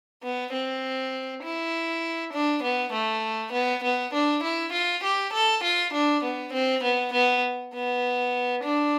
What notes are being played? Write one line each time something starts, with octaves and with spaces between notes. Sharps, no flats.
B3
C4
E4
D4
B3
A3
B3
B3
D4
E4
F4
G4
A4
F4
D4
B3
C4
B3
B3
B3
D4